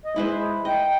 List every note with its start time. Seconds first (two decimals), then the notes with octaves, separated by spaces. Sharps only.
0.04 D#5
0.16 G#3 E4 B4 C5
0.65 D#5 G5